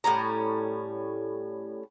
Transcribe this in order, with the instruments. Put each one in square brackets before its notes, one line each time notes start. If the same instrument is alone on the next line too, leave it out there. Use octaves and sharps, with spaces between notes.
[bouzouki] A2 G3 C#4 A#5